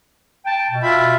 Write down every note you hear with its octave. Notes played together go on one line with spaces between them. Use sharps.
G5 A5
B2
F4 E5 B5